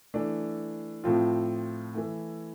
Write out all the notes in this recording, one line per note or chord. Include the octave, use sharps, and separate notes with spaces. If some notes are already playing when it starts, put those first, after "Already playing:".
E3 A3 D4
A2 F3 C4 F4
E3 A3 E4